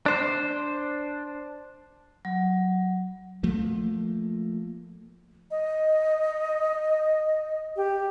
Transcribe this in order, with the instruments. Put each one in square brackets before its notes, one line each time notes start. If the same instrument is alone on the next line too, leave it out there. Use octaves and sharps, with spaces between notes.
[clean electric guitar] D4 C5
[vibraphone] F#3
[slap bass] F3 A3 A#3
[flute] D#5
G4